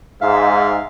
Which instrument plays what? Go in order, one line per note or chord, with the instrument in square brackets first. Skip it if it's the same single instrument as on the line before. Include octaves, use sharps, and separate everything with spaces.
[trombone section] G#2 [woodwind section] E5 F5